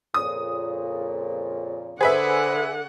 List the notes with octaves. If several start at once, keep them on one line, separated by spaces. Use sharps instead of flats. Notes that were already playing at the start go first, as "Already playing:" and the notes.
F2 A#2 C#3 D#6
D3 G#4 B4 C5 E5 F#5